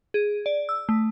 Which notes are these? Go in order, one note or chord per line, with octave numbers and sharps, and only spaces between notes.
G#4
D5
E6
A3